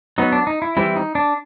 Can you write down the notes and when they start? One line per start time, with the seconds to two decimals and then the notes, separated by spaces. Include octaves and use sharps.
0.18 F#3 B3 D#4
0.32 D4
0.47 D#4
0.62 E4
0.77 E3 G3 C4 E4
0.96 D#4
1.15 D4